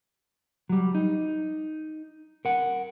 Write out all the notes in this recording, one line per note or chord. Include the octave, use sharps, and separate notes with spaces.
F#3 G3
D#4
A#4 F#5